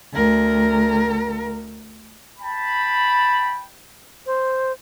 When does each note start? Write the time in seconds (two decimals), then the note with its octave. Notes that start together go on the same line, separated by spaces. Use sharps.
0.13 D2 A#4
2.39 G5 A5 B5
4.27 C5